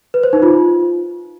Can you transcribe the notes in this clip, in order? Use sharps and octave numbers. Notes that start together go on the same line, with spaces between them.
B4
C5
D#4
F4